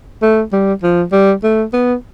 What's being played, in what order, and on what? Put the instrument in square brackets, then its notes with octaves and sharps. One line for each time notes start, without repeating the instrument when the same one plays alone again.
[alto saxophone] A3
G3
F3
G3
A3
B3